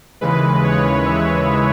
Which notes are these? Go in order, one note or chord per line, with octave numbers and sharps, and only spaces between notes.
D#2 C#3 E3 G#3 B4
C#5
E5